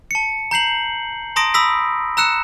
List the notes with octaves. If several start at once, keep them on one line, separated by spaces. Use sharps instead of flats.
A5 C#7
A#5 G6 C7 F#7
A5 A#5 C6 D#6 A#6 D7
B5 D#6 E6 A#6 B6
A#5 E6 F#6 C#7 E7